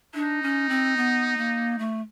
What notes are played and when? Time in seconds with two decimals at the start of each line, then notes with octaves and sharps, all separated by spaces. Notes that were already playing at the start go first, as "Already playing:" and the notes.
0.14 D4 D#4
0.42 C#4
0.69 C4
0.97 B3
1.37 A#3
1.79 A3